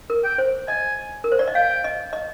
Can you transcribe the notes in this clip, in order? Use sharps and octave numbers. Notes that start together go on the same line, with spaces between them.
A#4
G5
C5
D#5 G#5
A#4
C5
D5
D#5
F5 G5
D#5
D#5